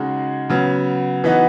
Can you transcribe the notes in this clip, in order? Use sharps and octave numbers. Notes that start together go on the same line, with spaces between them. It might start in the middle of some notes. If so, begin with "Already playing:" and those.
Already playing: C#3 G#3 D#4 F#4
C#3 F#3 B3
E3 B3 D#4 F#4